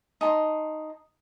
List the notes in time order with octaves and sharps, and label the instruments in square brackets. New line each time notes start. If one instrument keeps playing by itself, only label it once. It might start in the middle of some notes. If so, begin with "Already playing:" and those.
[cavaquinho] D#4 A5 C6